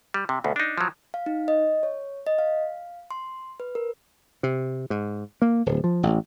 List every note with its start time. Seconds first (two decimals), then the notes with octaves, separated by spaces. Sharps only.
0.14 G3
0.29 C3
0.44 D2 B2
0.56 D4 D#4
0.78 F3 F#3
1.14 F5
1.26 D#4
1.48 D#5
1.83 C#5
2.27 D#5
2.39 F5
3.11 C6
3.60 B4
3.75 A#4
4.43 C3
4.90 G#2
5.42 A#3
5.66 D1
5.84 F3
6.03 A1